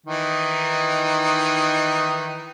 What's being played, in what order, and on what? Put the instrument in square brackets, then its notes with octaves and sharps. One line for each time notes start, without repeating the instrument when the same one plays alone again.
[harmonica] D#3 E3 D#4